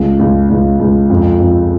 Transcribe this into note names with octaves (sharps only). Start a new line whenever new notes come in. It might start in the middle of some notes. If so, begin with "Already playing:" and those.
Already playing: C#2
C#2
C#2
C#2
F2
F2